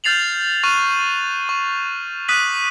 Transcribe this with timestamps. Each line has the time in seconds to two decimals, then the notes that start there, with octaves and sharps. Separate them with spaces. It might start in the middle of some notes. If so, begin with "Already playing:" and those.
0.04 F6 G6 A6 C7 F7 F#7
0.64 C#6 F6 F#6 A6 D#7
1.49 C#6
2.28 D6 D#6 F#6 B6 D#7 F#7